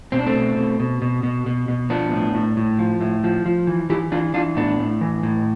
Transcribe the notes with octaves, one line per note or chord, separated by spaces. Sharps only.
B2 C4
D4
A3 C4
B2
B2
B2
B2
B2
B2
B2
F3 B3 D4
A2
A2
A2
F3
A2
F3
F3
E3
E3 E4 G4
E3 D4 F4
E3 D4 F4
A2 B3 D4
A2
E3
A2